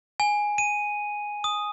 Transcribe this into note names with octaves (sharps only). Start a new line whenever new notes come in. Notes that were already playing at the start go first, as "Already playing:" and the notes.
G#5
D#7
D#6